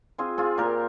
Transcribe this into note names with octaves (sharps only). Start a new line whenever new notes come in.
C4 F4 G#4
C4 F4 G#4
A#2 G4 A#4